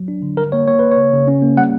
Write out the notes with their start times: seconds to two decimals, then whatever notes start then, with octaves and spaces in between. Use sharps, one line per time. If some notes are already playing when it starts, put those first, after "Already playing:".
Already playing: F#3
0.08 D4
0.22 D3
0.37 G3 A#4
0.52 A#3 C#5
0.67 A#3 C#5
0.79 A#3 B4
0.92 C#5
0.97 C#3
1.13 C#3
1.28 C#4
1.42 A#3
1.57 G3 F#5